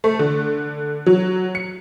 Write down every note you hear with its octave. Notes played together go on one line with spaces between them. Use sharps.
A3
D3
F#3
C#7